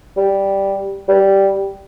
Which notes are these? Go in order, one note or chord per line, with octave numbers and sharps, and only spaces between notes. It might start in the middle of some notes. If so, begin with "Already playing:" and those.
G3
G3